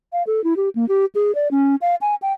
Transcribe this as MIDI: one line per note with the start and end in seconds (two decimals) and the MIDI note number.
0.13 0.23 77
0.27 0.43 69
0.44 0.54 64
0.57 0.69 67
0.75 0.87 58
0.89 1.05 67
1.15 1.34 68
1.35 1.48 74
1.51 1.76 61
1.82 1.95 77
2.01 2.15 80
2.22 2.33 79